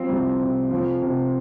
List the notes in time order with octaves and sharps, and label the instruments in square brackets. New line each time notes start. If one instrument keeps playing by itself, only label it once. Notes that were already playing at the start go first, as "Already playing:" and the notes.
Already playing: [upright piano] F3 C4
C2
C3
F3
C3